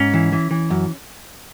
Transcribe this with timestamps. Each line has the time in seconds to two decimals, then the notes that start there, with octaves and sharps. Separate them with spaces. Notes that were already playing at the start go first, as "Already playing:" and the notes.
Already playing: G#2 C#4
0.14 E3
0.32 E3
0.51 E3
0.70 F#2